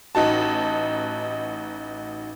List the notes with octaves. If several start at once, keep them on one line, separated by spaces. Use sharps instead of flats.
A1 D#4 F#4 A5